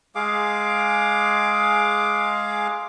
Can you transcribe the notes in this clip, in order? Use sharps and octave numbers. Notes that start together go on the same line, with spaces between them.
G#3 G#4 F5 D6